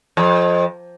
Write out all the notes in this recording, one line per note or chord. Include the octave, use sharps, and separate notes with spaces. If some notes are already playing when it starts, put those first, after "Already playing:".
F2